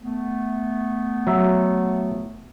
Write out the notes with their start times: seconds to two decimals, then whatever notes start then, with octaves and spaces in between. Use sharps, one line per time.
0.02 A3 B3
1.27 F#3 E5